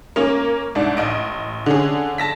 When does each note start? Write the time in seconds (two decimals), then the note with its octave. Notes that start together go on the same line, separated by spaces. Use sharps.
0.16 A#3 C#4
0.75 C2 G#2 D4
0.97 A1 D#5 D7
1.66 D3 C#4 G#4
2.18 A5 A#6 B6